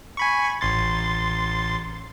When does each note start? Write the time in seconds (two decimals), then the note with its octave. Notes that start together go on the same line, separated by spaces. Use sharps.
0.17 G#5 B5 C#6
0.61 A1 C6 A6